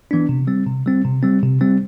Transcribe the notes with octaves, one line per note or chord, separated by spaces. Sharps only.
E3 B3 D4
C3
G3 C4
C3
G3 C4
C3
G3 C4
C3
G3 C4